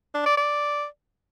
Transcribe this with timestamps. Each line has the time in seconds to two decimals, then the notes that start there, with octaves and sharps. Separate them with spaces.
0.15 D4
0.26 D5
0.38 D5